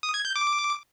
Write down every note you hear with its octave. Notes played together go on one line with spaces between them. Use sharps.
D#6
G#6
G6
D6